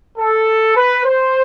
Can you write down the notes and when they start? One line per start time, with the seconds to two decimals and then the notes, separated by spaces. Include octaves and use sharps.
0.18 A4
0.75 B4
1.04 C5